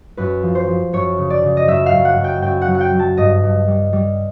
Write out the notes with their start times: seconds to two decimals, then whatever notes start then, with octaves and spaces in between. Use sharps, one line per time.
0.17 F#2 B4
0.43 F3
0.55 C5
0.68 F3
0.93 F#2 C#5
1.18 C#3
1.30 D5
1.43 C#3
1.57 D#5
1.67 F#2 E5
1.86 F5
1.93 F#2
2.05 F#5
2.18 F#2
2.24 G5
2.42 F#2 G5
2.62 F#5
2.67 F#3
2.75 F#5
2.81 G5
2.93 F#3
2.99 A5
3.17 G2 D#5
3.43 G2
3.68 G3
3.93 G3